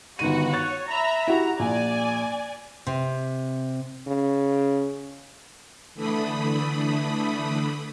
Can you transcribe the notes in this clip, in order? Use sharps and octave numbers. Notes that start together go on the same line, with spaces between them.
G1 D#3 F#4 F#5 D#7
C#5 C#6 F#6 A6
E5 A#5 B5
E4 F#4 G4 A#5
A#1 D5 G#5
C3
C#3
D3 E3 A3 D4 B5 D#6